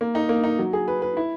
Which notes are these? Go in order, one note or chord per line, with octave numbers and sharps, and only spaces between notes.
A#3
D#4
A#3
D#4
F#3
G#4
B4
B4
E4